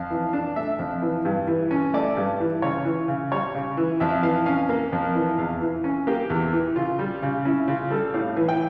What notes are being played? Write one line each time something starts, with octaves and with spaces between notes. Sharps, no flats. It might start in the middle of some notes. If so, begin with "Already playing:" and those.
Already playing: F2 F5
E3
D4
A3 E5
F2
E3
G2
E3
C#4
A3 D5
G2
E3
C#3 C#5
E3
C#3
G3 C#5
C#3
E3
F2 E5
E3 F5
C#4 F5
A#3 F5
F2
E3
E2 F5
E3
C#4
A#3 G4
E2
E3
C#3 F4
G3
C#3
C#4 E4
C#3 F4
G3 A4
A2 F5
E3
G5